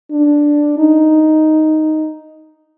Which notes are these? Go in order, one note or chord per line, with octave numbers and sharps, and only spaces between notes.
D4
D#4